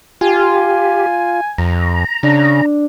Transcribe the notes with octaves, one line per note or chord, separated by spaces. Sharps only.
F4 G4 G#5
F2 A#5
C#3 D4